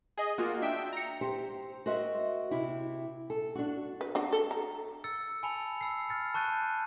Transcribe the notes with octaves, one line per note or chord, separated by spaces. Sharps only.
G#4 D#5
A#3 F4 F#4
D4 E5 G5
A#5 C#7
G4 C5
F#4 A#4 C5 D#5 E5
C3 E4
A4
D4 F#4
B4
D4 F#4
A4
A#5
E6 A6 C#7
G#5 A5 B5 E6 C#7 F7
B5 E6 C7
F6 A6 C#7
A5 C#6 F#6 G6 A6 D#7